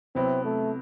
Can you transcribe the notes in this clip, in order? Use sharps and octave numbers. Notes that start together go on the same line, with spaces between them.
C3 F#3 B3 C4 E4
A3